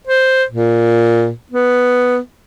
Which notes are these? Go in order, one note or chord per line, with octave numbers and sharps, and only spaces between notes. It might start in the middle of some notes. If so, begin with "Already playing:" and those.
C5
A#2
B3